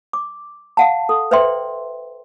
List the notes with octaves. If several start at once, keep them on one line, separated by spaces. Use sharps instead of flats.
D6
F5 F#5 A5
A4
B4 C5 D5 E5 G5 C6